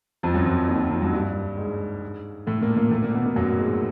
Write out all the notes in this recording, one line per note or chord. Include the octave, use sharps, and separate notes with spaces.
F2 F3
F#2 F#3
F2 F3
D#2 D#3
F2 F3
F#2 F#3
G2 G3
G#2 G#3
A2 A3
A#2 A#3
A#2 A#3
A2 A3
A#2 A#3
B2 B3
A#2 A#3
F#2 F#3
G#2 G#3